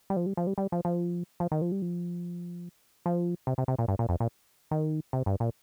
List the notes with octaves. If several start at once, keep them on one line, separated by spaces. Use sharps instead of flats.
G3
F3
G3
F3
G3
G3
F3
F3
F3
D#3
F3
G3
F3
F3
C3
C3
C3
A#2
G2
A#2
F2
A#2
D#3
C3
G2
A#2